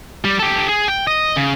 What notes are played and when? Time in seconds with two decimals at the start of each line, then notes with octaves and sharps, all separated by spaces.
0.25 G3
0.39 G4 A4
0.69 G#4
0.88 G5
1.07 D#5
1.37 C#3